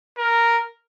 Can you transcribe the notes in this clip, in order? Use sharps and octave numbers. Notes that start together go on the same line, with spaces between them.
A#4